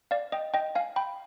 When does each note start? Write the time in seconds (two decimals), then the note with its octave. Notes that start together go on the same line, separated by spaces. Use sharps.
0.11 D5 F5
0.32 D#5 G5
0.54 D#5 G5
0.75 F5 G#5
0.96 G5 B5